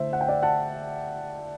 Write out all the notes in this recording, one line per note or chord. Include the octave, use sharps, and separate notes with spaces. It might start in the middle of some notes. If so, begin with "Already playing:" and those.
Already playing: D3 A3 E4 C5 E5
F#5
G5
D5 F#5
F#5 A5